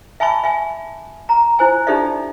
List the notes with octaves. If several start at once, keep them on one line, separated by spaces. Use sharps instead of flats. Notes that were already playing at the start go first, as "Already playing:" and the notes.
E5 G#5 A5 B5 C#6
E5 G#5
A#5
E4 C5 G#5
D4 D#4 G4 A4 D5 E5